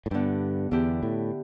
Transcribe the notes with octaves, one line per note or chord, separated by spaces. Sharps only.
A2
G2 D3 B3 E4 G4
E2 D3 B3 E4 G4
A2